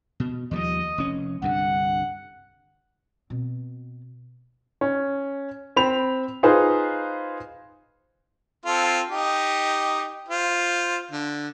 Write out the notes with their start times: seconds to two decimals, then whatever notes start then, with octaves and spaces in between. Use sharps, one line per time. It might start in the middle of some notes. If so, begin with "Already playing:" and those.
0.20 B2
0.51 D#2 F3 G3 D#5
0.98 F1 C#4
1.42 C2 G2 D3 F#5
3.30 B2 C4
4.81 C#4
5.76 C4 B5 F7
6.43 D#4 F4 G#4 B4 C5
8.66 C4 F4 A4
9.08 D#4 G4
10.29 F4 C5
11.11 D3